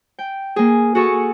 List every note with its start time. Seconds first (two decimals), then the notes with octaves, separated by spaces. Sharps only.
0.19 G5
0.56 A#3 G#4
0.95 F#4 G#4 A4 C#6